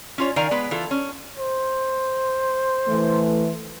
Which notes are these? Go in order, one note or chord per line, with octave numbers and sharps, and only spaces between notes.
C#4 F4 C#5
D#3 A#4 D5 F5 G#5 A#5
G#3 B3 B4
E3 F4 A4
C#4
C5
E3 A3